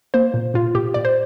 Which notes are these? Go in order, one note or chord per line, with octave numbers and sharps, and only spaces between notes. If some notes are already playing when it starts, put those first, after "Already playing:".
A#3 C5
A#2
A#2 F4
A#2 G4
A#2 D5
C5